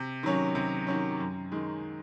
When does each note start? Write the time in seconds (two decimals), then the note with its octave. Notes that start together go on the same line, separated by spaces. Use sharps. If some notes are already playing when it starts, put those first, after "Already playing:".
Already playing: C3
0.23 D#3 F#3 C#4
0.55 C3
0.87 D#3 F#3 C#4
1.20 F#2
1.52 D#3 G#3